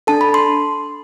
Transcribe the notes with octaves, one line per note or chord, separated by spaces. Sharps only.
D4 A4 A5
B5
C6